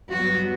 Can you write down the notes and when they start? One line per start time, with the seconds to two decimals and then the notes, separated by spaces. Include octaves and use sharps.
0.12 G2 F#3 B3 F#4